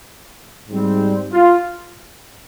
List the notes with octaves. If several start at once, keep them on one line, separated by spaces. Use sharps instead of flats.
G#2 G3 C4
F4